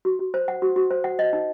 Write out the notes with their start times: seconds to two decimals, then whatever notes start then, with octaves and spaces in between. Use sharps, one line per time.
0.05 F#4
0.19 F#4
0.34 C5
0.48 F#5
0.62 F#4
0.76 F#4
0.90 C5
1.04 F#5
1.19 D#5
1.33 D#4